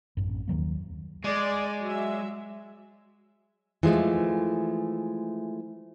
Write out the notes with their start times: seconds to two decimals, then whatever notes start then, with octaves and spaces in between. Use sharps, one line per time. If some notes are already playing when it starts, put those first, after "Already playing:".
0.17 A1 F#2
0.48 D#2 D#3 F#3 A#3
1.24 G#3 D5
1.82 F#3 E5
3.83 E3 F3 G#3 A3